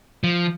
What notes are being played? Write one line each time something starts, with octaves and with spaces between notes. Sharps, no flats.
F3